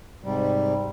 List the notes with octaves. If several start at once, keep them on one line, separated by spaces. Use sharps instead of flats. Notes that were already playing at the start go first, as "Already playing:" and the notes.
G#2 C3 G3